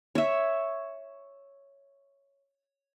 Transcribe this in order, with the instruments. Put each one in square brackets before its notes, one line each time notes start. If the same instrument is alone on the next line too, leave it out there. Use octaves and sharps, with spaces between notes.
[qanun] C#5 E5